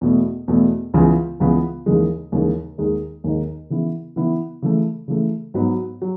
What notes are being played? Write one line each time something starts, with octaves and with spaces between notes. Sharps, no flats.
E2 B2 A3
E2 B2 A3
C#2 C#3 E3 B3
C#2 C#3 E3 B3
D#2 C#3 E3 G#3
D#2 C#3 E3 G#3
D#2 D#3 G#3 D#4
D#2 D#3 G#3 D#4
C#3 E3 B3 E4
C#3 E3 B3 E4
C#3 E3 A3
C#3 E3 A3
G#2 F#3 B3
F#3